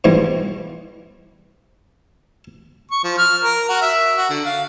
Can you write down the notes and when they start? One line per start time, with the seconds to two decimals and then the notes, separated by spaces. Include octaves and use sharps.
0.04 G#2 B2 E3 F3 G3 G#3
2.91 C#6
3.04 F3
3.18 F6
3.43 A#4
3.69 F#4
3.82 E5
4.16 F#4
4.29 D3
4.45 F5